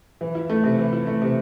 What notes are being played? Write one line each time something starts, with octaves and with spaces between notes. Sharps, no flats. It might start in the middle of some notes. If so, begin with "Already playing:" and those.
E3
E4
A3
C3
E3
E4
A3
C3